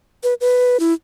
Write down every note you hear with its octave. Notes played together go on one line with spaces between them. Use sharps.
B4
B4
E4